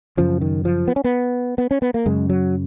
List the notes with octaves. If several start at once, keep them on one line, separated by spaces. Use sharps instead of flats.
F#2 C#3 F3
D#3
F3
B3
C#4
B3
B3
C#4
B3
A#3
F#2 C#3 G#3
F#3